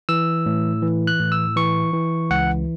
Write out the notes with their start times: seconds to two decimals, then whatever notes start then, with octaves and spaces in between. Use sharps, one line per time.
0.09 E3 E6
0.46 A2
0.82 E3
1.07 F#6
1.20 A2
1.32 E6
1.56 E3 C#6
1.94 E3
2.30 C#2 F#5